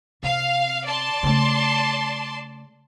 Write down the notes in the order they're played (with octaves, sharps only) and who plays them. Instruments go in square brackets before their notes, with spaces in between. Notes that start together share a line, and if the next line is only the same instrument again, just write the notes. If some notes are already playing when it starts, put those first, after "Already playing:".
[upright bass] C3 [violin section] F5
[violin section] D5 A5 C6
[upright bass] C#3 A3